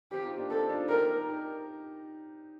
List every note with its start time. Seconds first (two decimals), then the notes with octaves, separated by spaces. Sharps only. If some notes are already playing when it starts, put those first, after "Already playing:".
0.12 C4 G4
0.18 F4
0.24 C4 D#4
0.37 A#3 D4
0.50 C4 D#4 A4
0.69 D4 F4
0.89 D#4 G4 A#4
1.28 D#4 G4